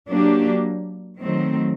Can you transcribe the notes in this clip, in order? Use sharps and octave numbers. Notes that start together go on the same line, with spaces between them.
F#3 A#3 D4 G4
D#3 F#3 A3 C4